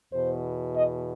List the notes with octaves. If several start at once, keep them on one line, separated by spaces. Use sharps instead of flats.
E2 B2 C5
D#5